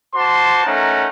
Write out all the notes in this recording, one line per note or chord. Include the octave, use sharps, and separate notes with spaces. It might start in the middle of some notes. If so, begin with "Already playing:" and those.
F#4 C5 A5 C6 D6
A3 C#4 D#4 A#4 F#5